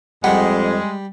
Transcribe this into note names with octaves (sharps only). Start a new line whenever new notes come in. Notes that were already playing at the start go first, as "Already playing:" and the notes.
F2 G3 G#3 F#5